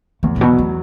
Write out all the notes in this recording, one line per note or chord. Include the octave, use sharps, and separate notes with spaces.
E2 A3
A2
B2 F#3
A3